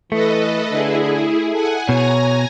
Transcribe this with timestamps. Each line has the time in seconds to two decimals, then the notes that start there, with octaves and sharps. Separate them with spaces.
0.12 E3 A3 A4 B4 D#5
0.72 D3 E4 G#4
1.52 A4 F#5 G#5
1.89 B2 C#5 G#5 A#5 A#6